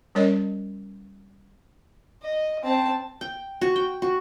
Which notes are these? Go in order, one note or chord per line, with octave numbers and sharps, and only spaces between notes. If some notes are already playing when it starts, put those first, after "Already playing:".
G3 C#4 A#4 C#5 D#5
D#5
C4 A5
G5
F#4
G5
F#4